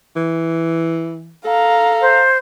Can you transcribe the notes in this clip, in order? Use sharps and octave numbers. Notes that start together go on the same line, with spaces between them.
E3
A4 F5 A#5
C5